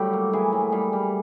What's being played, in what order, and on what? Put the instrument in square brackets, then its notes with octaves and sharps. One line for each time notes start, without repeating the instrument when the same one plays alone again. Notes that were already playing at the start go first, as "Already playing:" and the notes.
Already playing: [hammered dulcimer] A2 D3 F#3 G3 G4
A#3
E3 G#4
A2
G3 G#4
G3